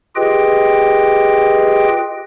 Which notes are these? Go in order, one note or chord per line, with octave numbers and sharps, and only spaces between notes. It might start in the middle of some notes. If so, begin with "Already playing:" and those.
F4 G4 G#4 B4 D#5 G5